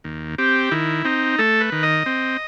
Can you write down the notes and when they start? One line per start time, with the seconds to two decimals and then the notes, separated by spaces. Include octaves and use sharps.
0.04 D#2
0.38 C4 G4
0.72 D#3 E4
1.05 C4 D#4
1.38 A3 A4
1.61 B4
1.72 D#3
1.83 D#5
2.06 C4